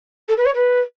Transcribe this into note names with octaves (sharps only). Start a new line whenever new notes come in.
A4
B4
C#5
B4